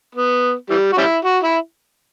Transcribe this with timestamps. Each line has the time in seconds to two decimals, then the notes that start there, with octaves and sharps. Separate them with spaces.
0.15 B3
0.70 E3 G3
0.92 F#4
0.97 G3 C#4 E4
1.25 F#4
1.43 E4